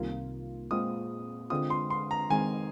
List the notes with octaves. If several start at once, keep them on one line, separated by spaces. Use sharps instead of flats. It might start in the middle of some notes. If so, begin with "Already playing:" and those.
Already playing: C2 C3 D#3 A#3 F4
A#2 G#3 C4 F4 D#6
D3 G#3 C4 F4 D#6
C6
C6
A#5
D#3 G#3 C4 G#5